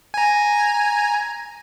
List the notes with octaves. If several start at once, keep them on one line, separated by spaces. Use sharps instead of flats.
G#5 A#5